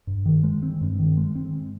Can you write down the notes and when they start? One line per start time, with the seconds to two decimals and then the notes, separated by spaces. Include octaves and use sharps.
0.07 G2
0.26 D#3
0.43 G#3
0.63 C4
0.81 G2
0.99 D#3
1.17 G#3
1.35 C4